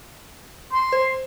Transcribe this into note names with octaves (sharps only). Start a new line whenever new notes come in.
C6
C5